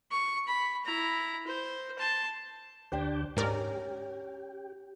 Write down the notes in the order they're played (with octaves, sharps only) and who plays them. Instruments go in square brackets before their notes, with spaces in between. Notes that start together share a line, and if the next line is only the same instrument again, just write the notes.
[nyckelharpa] C#6
B5
E4 A#5
C5
A5 C6
[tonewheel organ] D2 D5 G5 [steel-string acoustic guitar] D4 G4 C5
[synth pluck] G#2 A#4 D5 [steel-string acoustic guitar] C#4 [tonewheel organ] G4